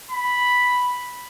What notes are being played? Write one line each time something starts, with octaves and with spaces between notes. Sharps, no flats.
B5